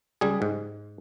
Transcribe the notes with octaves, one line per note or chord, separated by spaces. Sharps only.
C#2 G3 G#4
G#2